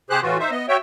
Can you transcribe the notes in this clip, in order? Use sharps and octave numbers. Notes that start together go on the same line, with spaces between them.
C3 G4 G#4 C5 F#6
A2 E3 F4 F#4
D#4 C5 E5
B3 D#5
F#4 C#5 E5 G5